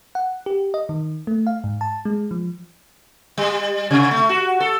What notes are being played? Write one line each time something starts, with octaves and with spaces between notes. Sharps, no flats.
F#5
G4
D#5
D#3
A3
F5
G#2
A5
G#3
F3
G3
C3
A3
F#4
A4